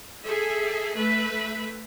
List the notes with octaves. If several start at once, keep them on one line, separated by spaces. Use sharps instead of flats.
G#4 A4 E5
A3 B4 E5 B5